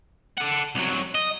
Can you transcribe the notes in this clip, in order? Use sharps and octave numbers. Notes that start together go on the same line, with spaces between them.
A4 F#5
C2 F#3
D#5